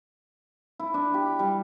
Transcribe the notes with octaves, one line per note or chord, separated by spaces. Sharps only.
E4
D4
G4
G3